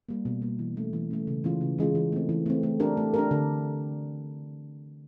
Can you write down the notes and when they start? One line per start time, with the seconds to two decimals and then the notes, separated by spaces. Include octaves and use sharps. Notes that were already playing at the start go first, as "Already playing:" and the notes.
0.09 G3 A#3
0.25 B2
0.42 G3 A#3
0.59 E3
0.76 A3 C#4
0.93 E3
1.11 A3 C#4
1.27 C#3
1.44 E3 G#3 C#4 F4
1.61 C#3
1.78 E3 G#3 C#4 F4
1.95 E3
2.12 A3 C4
2.29 E3
2.46 A3 C4
2.63 A3
2.80 D4 G4 A#4
2.97 A3
3.14 D4 G4 A#4
3.31 D3